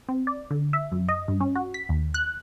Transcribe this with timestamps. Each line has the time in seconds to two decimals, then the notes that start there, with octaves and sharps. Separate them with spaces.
0.09 C4
0.27 D5
0.51 D3
0.73 E5
0.92 F#2
1.09 D#5
1.28 G2
1.40 C#4
1.55 F#4
1.74 B6
1.89 D#2
2.14 F#6